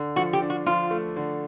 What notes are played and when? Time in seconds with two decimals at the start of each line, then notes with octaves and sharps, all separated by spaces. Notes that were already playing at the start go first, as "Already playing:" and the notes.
Already playing: D3
0.16 F3 F#4
0.33 G4
0.42 D4
0.50 F#4
0.66 F3 F4
0.91 A3
1.16 D3